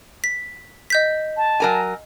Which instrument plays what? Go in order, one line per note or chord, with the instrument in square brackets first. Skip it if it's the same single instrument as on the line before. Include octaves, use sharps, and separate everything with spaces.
[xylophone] B6
D#5 G6 B6
[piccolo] A5
[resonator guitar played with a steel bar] F#3 A#4 G#5